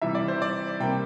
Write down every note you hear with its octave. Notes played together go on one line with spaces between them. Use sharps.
C3 E3 G3 E5
D5
C5
D5
C3 G3 A#3 G5